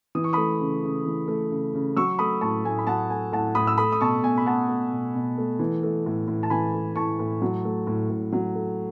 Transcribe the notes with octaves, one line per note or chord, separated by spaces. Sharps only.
E3 D#6
C#6
A3 B5 D#6
C#3
C#3
E3
A3
C#3
C#3
F#3 C#6 E6
A3 B5 D#6
A2 A5 C#6
A2 G#5
B5
F#3 F#5 A5
A3 G#5
A2 F#5 A5
A2 B5 D#6
E6
A3 B5 D#6
D#6
B2 A5 C#6
B2 G#5
B5
A3 F#5 A5
A3
B2
B2
A3
E3
A3
A2
A2
A5
E3 G#5 B5
A3
A2 A5 C#6
A2
F#3
A3
A2
A2
F#3
A3